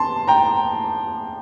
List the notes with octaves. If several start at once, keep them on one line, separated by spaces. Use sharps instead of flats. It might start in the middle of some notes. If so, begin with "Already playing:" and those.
Already playing: A5 C6
G5 A#5